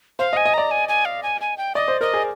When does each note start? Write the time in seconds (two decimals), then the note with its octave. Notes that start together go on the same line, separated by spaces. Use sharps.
0.19 C5 F5
0.33 D#5
0.37 G#5
0.46 D#5
0.54 D5 A#5
0.71 G#5
0.89 G#5
1.05 F5
1.23 G#5
1.41 G#5
1.57 G5
1.75 D5 D#5
1.88 C5
2.01 A#4 D#5
2.14 G#4